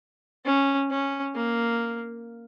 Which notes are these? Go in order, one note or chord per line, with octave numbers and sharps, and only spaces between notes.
C#4
C#4
A#3